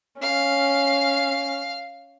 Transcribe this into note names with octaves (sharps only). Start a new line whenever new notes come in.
C#4 F5